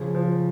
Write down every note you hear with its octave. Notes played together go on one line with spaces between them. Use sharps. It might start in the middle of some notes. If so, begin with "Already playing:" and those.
Already playing: C#3 F3
F3